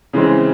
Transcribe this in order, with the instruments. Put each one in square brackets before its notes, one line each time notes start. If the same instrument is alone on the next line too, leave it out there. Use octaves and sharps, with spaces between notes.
[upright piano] C#3 E3 G#3 C4